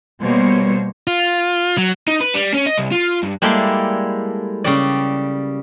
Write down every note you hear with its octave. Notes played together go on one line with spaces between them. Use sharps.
B2 G3 A#3 C5 C#5
F4
F#3
D#4
B4
G3
C#4
D#5
C2
F4
G2
G3 G#3 A#3 E4 A4 D5
C#3 G3 D5